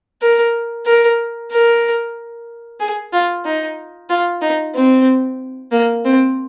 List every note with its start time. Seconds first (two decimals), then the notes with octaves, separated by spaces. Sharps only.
0.22 A#4
0.87 A#4
1.52 A#4
2.80 G#4
3.13 F4
3.45 D#4
4.10 F4
4.42 D#4
4.75 C4
5.72 A#3
6.05 C4